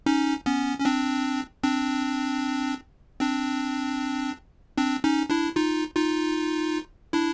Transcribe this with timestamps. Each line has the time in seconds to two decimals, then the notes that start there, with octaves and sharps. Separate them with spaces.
0.06 C#4 D#4
0.46 B3 C#4
0.80 C#4
0.85 C4 D4
1.63 C4 D4
3.20 C4 D4
4.78 C4 D4
5.04 C#4 D#4
5.30 D4 E4
5.56 D#4 F4
5.96 D#4 F4
7.13 D4 E4